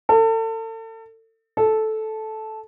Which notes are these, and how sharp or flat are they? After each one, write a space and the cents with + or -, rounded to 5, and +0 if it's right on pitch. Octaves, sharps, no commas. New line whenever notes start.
A4 +35
A4 -10